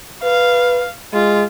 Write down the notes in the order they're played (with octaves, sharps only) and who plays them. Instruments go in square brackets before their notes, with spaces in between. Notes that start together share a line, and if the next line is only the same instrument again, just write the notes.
[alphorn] B4 [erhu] F5
[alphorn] G#3 [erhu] F4